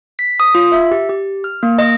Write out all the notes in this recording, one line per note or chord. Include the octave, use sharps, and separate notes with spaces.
B6
D#6
F4
E5
G4
G4
F6
A#3
D#5